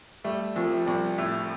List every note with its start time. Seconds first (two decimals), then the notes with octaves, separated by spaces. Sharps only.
0.24 G3 A3
0.56 C2 F3
0.86 C2 G3
1.18 A2